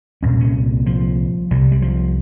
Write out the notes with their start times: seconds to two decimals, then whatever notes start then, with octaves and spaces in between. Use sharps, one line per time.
0.23 C2 A#2 C#4
0.41 C#4
0.86 F3
1.51 C2 C3 G3
1.72 G3
1.82 F3